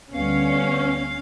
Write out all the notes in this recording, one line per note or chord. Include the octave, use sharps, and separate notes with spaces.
D2 G3 B3 C#4 F5